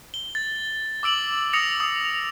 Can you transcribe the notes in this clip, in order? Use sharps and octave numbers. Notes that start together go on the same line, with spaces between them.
G7
A6
D6 E6 D7 F#7
D#6 A#6 C#7 F7
D#6